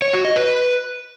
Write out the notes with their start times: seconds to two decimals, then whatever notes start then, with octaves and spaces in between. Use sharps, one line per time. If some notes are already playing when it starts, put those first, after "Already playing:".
0.02 C#5
0.13 F#4
0.25 D#5
0.36 B4